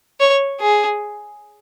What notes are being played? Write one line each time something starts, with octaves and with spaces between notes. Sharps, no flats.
C#5
G#4